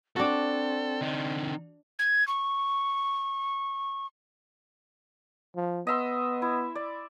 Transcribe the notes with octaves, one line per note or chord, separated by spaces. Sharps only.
C4 D4 F#4 A4
D3 D#4
G#6
C#6
F3
B3 D#5 E5 C6
E4
D5